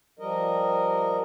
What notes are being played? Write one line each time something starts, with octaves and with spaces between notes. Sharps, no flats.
F3 G3 A#4 D#5